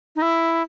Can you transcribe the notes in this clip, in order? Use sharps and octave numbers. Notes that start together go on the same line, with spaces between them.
D#4
E4